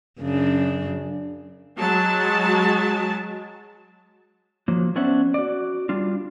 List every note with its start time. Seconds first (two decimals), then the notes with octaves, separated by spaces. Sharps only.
0.21 F#2 C#3 D4
1.78 F#3 G#3 A5
4.68 F3 F#3 A#3
4.96 B3 C#4 D4 C5 E5 F#5
5.34 F#4 D5
5.89 G3 D4 F4